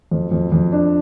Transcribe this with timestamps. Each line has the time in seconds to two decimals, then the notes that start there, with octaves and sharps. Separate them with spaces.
0.11 F2
0.32 F2
0.52 F2
0.72 D4